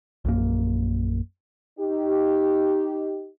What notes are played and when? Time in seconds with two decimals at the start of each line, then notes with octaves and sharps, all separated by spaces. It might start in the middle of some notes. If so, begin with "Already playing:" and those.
0.25 A#1 F#2 A#3
1.79 D#4 G4